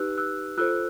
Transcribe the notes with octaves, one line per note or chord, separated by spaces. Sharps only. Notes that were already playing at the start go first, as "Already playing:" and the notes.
Already playing: D#4 G4 B4 E6 F#6
E6 F#6
F4 A4 C5 E6 F#6